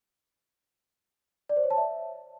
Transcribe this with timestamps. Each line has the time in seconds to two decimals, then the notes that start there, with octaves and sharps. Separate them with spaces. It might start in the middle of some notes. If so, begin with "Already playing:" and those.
1.49 D5
1.56 C5
1.63 C#5
1.70 A5
1.78 E5